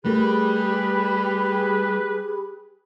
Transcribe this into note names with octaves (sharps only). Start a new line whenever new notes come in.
G3 A3 G4 G#4 A#4 B4 B5